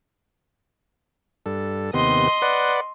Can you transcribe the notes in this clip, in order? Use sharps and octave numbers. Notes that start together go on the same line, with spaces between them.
G2 A4
D#2 C3 B3 D#5 C6
B4 D5 F#5